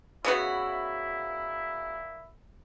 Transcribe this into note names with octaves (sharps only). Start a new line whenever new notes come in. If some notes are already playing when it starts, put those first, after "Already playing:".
A#2 C#3 B3 E4 F#4